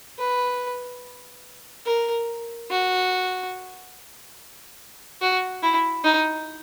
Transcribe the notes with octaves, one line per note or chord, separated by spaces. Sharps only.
B4
A#4
F#4
F#4
E4
D#4